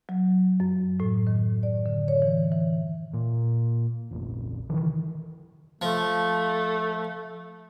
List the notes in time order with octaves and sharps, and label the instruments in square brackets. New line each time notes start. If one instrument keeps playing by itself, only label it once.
[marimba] F#3
F#2
A2
D#3
D5
D3
C#5
E3
E3
[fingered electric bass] A#2
F1 A#1
C3 D#3 E3
[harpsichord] F3 [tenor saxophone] A3